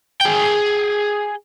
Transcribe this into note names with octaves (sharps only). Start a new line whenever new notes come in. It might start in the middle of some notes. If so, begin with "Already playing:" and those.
G#4 G5